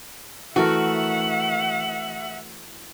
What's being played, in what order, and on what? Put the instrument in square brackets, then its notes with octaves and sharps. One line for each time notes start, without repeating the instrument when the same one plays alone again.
[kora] E3 A3 A#4 [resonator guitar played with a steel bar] F#4 [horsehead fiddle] E5 F#5